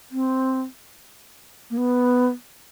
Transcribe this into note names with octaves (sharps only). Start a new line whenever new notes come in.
C4
A#3
B3